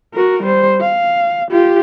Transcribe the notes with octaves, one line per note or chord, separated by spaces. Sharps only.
F#4 A#4
G3 C5
F5
F4 G4